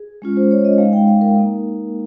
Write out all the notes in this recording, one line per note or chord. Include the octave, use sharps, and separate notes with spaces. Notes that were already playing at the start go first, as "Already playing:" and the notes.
Already playing: G#4
G#3 C#4 F4
C5
C#5
D#5
G#3 D#4 F5
G5
F5
A#4
A#3 D#4